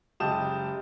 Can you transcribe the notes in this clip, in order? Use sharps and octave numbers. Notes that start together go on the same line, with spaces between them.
F#1 G#3 G4 A5 D#6 E7